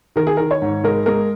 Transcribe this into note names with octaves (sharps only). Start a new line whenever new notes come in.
D#3 A#4
G#4
D#3 A#4
C#5
G#2
G#3 A#4
G#3 A#4